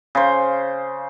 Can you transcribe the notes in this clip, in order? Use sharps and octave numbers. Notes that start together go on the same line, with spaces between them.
C#3 C5